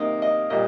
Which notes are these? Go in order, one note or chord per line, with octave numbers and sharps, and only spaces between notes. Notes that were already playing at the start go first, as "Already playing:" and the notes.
Already playing: C3 D#3 A#3 D#5
D#5
A#2 G3 D#5